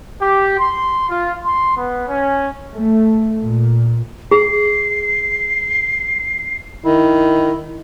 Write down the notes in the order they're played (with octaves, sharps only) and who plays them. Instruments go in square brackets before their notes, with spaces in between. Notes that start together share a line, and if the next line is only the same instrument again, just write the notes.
[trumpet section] G4
C6
F4
C6
B3
C#4
[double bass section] A3
A#2
[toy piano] G#4 [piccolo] C7
[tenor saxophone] D#3 [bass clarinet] E4